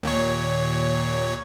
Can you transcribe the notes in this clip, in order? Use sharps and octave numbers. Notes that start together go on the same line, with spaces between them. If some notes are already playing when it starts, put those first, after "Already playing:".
D#2 A#2 C#5